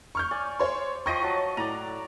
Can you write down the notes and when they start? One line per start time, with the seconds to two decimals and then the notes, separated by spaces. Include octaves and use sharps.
0.15 C#6 F6 G6
0.31 D5 G#5
0.60 C5 C#5 C6
1.06 F3 D#5 G5 C#6 A#6
1.22 F#3 A5
1.57 A2 D5 A#5